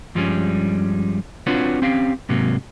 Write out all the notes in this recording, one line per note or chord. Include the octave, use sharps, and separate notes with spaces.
G2 F3 G3 G#3 B3 C#4
C4 D4 F4 F#4 B4 C#5
C4 C#4 G4 F5
G#2 C3 F#3 A#3